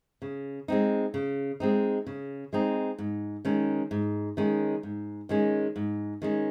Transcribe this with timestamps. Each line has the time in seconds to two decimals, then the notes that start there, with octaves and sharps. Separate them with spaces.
0.22 C#3
0.68 G#3 C4 D#4
1.14 C#3
1.60 G#3 C4 D#4
2.07 C#3
2.53 G#3 C4 D#4
2.98 G#2
3.45 D#3 G#3 C#4
3.91 G#2
4.37 D#3 G#3 C#4
4.83 G#2
5.29 D#3 G#3 C#4
5.76 G#2
6.22 D#3 G#3 C#4